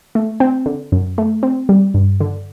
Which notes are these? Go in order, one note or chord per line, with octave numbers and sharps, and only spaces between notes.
A3
C4
D3
F#2
A3
C4
G3
G2
D3